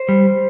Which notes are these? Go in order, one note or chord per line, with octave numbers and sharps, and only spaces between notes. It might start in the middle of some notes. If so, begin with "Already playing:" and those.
Already playing: C5
G3